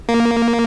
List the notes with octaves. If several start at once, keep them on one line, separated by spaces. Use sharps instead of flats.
A#3